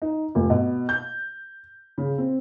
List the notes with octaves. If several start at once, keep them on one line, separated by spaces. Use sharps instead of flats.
D#4
F1
B2
G6
C#3
C4